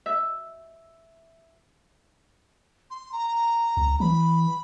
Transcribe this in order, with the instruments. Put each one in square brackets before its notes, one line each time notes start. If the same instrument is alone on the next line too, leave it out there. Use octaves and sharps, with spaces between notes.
[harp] E5
[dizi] C6
A#5
[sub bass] C#2
[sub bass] E3 [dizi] B5